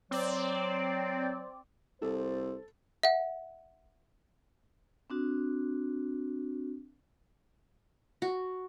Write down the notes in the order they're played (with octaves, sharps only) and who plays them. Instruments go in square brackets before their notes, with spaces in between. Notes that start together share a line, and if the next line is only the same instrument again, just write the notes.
[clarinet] F#3 [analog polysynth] C4 D5
[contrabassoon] C2 [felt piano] A4 [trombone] C5
[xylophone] E5 F#5
[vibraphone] C4 D4 F#4
[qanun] F#4